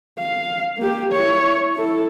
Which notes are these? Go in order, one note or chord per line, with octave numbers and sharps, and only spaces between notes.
F5
A#3 G4
E4 C#5
E4 A4